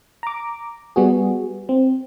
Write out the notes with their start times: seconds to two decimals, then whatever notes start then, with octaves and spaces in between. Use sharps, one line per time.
0.23 A#5 D6
0.96 G3 B3 F#4 G#4
1.69 C4